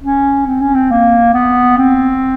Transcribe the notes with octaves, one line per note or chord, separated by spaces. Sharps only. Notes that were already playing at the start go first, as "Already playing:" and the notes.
C#4
C4
C#4
C4
A#3
B3
C4